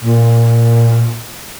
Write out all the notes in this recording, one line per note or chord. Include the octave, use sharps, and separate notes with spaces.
A#2